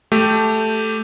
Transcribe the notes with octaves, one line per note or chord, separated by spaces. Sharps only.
A3 G4